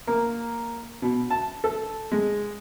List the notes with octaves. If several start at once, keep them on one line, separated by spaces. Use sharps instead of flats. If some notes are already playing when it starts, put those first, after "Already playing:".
A#3
B2
A5
A4
G#3